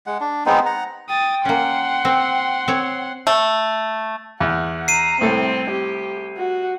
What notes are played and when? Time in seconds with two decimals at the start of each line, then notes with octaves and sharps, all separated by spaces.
0.07 G#3 F#5
0.21 D4
0.46 G#3 B3 C4 D#4
0.66 F#5 A#5
1.09 G5 D#6 A6
1.45 A#3 C#4 F#5 C6
2.05 C4
2.68 C4 C#5
3.27 A3
4.40 E2 F#5
4.88 A#5 C7 D#7
5.21 C2 A2 C4 A4
5.71 G4
6.37 F#4